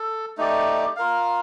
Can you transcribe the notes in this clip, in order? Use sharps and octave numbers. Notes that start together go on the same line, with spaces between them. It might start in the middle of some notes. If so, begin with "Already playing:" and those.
Already playing: A4
A3 D#4 G4 D5
F4 A#4 F5